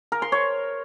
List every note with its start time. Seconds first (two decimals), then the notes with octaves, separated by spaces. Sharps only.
0.12 A#4
0.22 C6
0.32 C#5